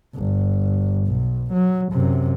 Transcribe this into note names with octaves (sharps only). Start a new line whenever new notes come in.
G1
B1
F#3
F#2 C3